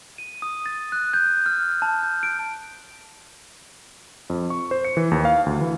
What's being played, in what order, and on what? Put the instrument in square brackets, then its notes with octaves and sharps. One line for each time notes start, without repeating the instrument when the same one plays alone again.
[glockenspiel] D#7
D#6
A6
F#6
G6
F6
A5
G6
D7
[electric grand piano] F2
C#6
C5
C#7
E3
D#2
F5
D2
E3